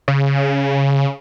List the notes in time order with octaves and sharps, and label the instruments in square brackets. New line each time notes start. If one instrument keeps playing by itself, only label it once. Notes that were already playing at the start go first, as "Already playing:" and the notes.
[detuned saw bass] C#3